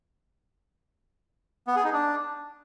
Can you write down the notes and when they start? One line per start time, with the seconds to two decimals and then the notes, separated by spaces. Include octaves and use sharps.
1.67 B3
1.76 G#4
1.84 D#4
1.93 D4